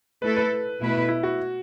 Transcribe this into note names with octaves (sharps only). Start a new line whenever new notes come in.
A3 E4 A4 B4
B4
B2 A3 E4 B4
E4
F#4